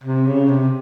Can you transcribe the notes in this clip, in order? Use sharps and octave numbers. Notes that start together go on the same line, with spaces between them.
C3
C#3
C3